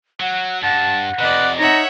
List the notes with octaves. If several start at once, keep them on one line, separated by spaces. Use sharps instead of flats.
F#3 F#5
G2 F#5 A5
F2 C3 B4 D5 D#5
D#4 C#5 E5 F#5 A#5